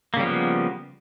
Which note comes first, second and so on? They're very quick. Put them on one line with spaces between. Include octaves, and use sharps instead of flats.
A#3 C#3 G3 F3 B3